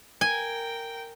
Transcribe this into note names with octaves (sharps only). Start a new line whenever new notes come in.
A#4 G5 G#5